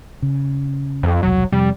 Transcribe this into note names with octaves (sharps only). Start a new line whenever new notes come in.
C#3
F2
E1 C2 F#3
F2 C3 G3